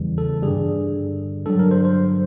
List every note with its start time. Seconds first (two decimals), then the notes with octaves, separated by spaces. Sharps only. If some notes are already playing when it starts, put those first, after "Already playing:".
Already playing: E2 C#3 E3 G3
0.18 A4
0.43 G2 D3 G3 G#4
1.46 G2 D3 F#3 A4
1.59 A#4
1.71 C5
1.85 C5